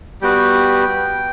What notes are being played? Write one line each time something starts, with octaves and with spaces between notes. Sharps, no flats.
G3 B3 F#4 G5